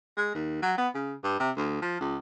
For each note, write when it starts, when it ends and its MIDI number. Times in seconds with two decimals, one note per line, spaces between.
0.17 0.30 56
0.34 0.59 39
0.62 0.75 54
0.78 0.88 59
0.94 1.14 49
1.24 1.38 43
1.40 1.50 48
1.56 1.77 38
1.82 1.96 53
2.01 2.17 37